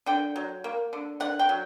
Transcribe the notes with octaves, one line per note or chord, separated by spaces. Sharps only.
D3 G5
F#3
A#3
D3
D3 F#5
G5
F#3